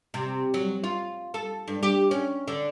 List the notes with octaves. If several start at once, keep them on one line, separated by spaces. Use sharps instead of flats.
C3
F#3
F4
A4
G2
G4
C#4
D3